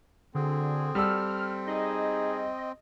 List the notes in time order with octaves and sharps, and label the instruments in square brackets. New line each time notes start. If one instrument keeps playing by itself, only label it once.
[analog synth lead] D3 [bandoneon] C4 [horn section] F#4 G#4
[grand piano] G3 A4 E6 [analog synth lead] F6
[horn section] D#4 G#4 [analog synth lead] D#5